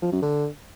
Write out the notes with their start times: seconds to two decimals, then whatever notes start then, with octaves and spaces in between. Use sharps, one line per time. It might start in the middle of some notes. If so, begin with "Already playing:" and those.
0.02 F3
0.12 F#2
0.22 D3